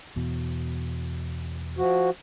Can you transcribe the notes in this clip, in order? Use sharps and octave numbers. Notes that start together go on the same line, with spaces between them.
E2 B2
F3 F#4